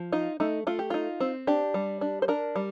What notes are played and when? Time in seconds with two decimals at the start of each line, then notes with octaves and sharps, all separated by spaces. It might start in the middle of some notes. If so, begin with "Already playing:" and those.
Already playing: F3
0.12 D#4 F4
0.40 A3 D#4
0.67 A3 F4
0.79 G4
0.90 D#4 F4
1.20 C4
1.47 D4 G4
1.74 G3
2.01 D4
2.22 C5
2.28 D4 A#4
2.56 G3